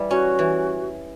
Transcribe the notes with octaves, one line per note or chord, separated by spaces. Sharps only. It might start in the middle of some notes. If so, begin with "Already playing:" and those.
Already playing: E3 G3
C#4 F#4
E3